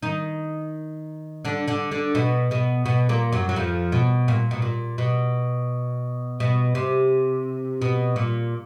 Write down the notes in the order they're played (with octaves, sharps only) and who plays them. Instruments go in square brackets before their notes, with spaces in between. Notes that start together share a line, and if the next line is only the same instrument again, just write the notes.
[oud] D#3 D#4
D3 D4
D3 D4
D3 D4
B2 B3
B2 B3
B2 B3
A#2 A#3
F#2 F#3
F#3
F2 F3
B2
A#2
B2
A#2
B2
B2
C3
B2
A#2